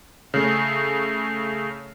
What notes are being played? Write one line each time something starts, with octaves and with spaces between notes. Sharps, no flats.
C#3 A3